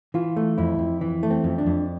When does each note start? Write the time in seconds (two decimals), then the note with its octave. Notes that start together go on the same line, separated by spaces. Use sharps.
0.14 E3 F4
0.37 A3
0.58 F2 E4
0.79 F2
1.01 E3
1.23 A3
1.30 C4
1.44 F2
1.58 D4
1.66 F2